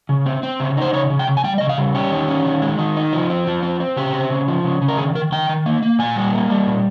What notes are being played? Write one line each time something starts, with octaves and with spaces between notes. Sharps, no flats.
C#3
C4
C4
C#3
D#4 C5
C#3 C#5
C#3
G5
C#3
G#5
G3 G5
C#3 D#5
F5
G3
C#4 G4
D#3
C#4
D#3
G#3
D#3
D#4
F3
C4
F3
C4
C4
C#3 G4
C4
C#3
F3
C#3
C#3
A#4
D#3 G#4
D#3 A#4
D#3 G5
D#3
A#3
A#3
A#2 G#5
G3
A#3
G3
A#2